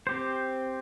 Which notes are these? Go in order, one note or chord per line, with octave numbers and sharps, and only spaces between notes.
C4 G4 C5